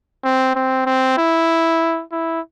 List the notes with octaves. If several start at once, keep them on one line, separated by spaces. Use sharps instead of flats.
C4
C4
C4
E4
E4